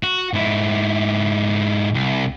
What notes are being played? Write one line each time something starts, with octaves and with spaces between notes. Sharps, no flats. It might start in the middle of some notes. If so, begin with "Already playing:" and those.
F#4
G#2 E4
C2